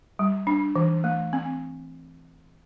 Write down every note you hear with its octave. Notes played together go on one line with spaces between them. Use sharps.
G3
D4
E3
A3
C4